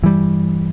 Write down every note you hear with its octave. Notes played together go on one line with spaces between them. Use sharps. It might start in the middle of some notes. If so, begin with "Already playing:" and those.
G2 E3 G3